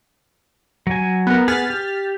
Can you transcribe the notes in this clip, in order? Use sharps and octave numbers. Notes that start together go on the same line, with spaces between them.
F#3 G#5
B3 A#4
B3 G#4 F6 A6 B6
G4